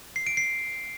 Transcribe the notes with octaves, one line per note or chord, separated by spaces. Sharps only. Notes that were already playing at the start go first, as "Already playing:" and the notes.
C7
D7
C7